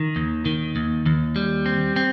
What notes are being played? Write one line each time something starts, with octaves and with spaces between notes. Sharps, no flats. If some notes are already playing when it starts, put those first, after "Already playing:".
Already playing: D#3
D#2
D#3
D#2
D#2
G3
C4
C4